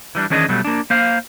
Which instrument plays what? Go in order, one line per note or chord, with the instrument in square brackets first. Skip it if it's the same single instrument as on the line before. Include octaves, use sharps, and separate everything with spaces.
[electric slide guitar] E3 G3 D4
D#3 E3 C#4 D4 G#4 D#5
B2 F#3 G3 A3
A#3 D4
A#3 C5 F5